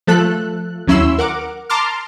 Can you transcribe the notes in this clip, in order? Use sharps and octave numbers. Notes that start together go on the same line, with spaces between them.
F3 A3 A4 F#6
D#2 F#3 C#4 E4 C6 E6
A#4 F#5 D6
A5 A#5 C6 D6 F6